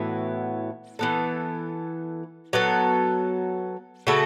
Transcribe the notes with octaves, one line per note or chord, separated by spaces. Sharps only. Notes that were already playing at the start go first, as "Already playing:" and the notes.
Already playing: A2 E3 B3 F#4
E3 B3 A4
F#3 B3 A4
C#3 A3 F#4 A4